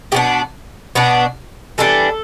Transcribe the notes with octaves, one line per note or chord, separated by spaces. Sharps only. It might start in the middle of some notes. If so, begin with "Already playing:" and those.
B2 B3 D4 G4
B2 B3 D4
E3 G3 B3 D4 A4